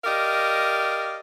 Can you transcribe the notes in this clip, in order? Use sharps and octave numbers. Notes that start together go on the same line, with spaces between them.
G4 A#4 D5 D#5 F5